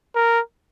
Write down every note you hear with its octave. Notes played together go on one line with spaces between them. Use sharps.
A#4